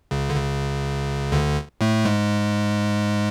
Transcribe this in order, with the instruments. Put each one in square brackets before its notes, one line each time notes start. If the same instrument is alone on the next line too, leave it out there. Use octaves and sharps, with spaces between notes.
[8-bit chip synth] C#2 C#3
D3
C#2 C#3
D2 D3
A2 A3
G#2 G#3